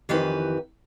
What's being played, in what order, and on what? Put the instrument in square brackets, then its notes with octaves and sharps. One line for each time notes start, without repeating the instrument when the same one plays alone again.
[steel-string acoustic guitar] F2 D#3 E3 G4 B4